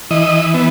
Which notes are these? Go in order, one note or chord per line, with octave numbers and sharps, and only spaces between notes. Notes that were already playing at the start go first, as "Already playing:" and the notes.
E3 D#5
B3